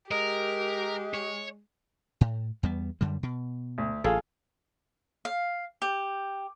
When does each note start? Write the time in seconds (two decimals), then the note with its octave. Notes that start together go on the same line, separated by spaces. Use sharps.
0.11 G#3 G4 A#4
1.14 C#5
2.21 A2
2.63 E2 G3 B3
3.01 F#2 D3 G3
3.23 B2
3.78 D2
4.04 A1 F4 G#4 A4
5.25 F5
5.82 G4